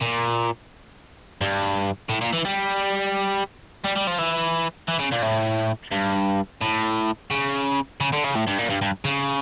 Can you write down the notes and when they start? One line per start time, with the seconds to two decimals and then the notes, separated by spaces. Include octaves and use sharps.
0.02 A#2
1.41 G2
2.10 A2
2.21 A#2
2.33 E3
2.45 G3
3.84 G3
3.96 G3
4.07 F3
4.18 E3
4.88 E3
4.99 C#3
5.12 A#2
5.22 A2
5.91 G2
6.61 A2
7.30 C#3
8.00 C#3
8.12 D3
8.24 C#3
8.35 A2
8.47 G2
8.58 A#2
8.70 G2
8.81 G2
9.05 C#3